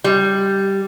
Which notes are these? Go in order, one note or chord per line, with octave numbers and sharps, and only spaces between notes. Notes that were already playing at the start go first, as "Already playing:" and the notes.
G3